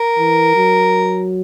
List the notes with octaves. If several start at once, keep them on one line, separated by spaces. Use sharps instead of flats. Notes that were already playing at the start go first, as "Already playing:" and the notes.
Already playing: A#4
E3
F#3